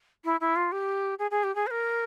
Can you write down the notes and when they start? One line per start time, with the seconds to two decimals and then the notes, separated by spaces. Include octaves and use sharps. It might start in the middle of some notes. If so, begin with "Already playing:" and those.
0.25 E4
0.41 E4
0.56 F4
0.72 G4
1.19 G#4
1.31 G#4
1.44 G4
1.55 G#4
1.67 C5
1.71 A#4